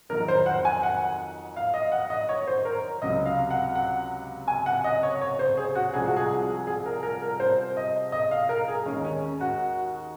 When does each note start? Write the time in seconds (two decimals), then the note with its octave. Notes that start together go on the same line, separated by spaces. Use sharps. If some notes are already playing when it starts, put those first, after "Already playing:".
0.09 F2 A#4
0.13 D#3 F#3
0.28 C5
0.46 F#5
0.65 G#5
0.83 F#5
1.56 F5
1.74 D#5
1.92 F#5
2.10 D#5
2.29 C#5
2.47 C5
2.65 A#4
3.02 C#2 C3 F#3 D#5
3.26 F5
3.51 F#5
3.76 F#5
4.48 G#5
4.66 F#5
4.84 D#5
5.03 C#5
5.22 C#5
5.39 C5
5.57 G#4
5.75 F#4
5.93 C2 C3 F3 G#3 G#4
6.06 F#4
6.17 G#4
6.67 G#4
6.86 A#4
7.03 A#4
7.22 A#4
7.40 C5
7.77 D#5
8.12 D#5
8.31 F5
8.49 A#4
8.68 G#4
8.86 D#2 D#3 G#3 C#4
9.04 C#4
9.41 F#4